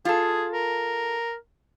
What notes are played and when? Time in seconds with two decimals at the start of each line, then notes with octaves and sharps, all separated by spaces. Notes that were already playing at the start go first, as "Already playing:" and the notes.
0.05 F4 G#4 A4
0.54 A#4